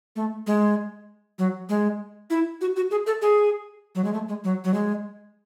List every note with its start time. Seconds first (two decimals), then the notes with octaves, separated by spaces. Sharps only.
0.16 A3
0.47 G#3
1.39 F#3
1.69 G#3
2.30 E4
2.61 F#4
2.76 F#4
2.91 G#4
3.07 A4
3.22 G#4
3.95 F#3
4.04 G#3
4.13 A3
4.28 G#3
4.44 F#3
4.64 F#3
4.74 G#3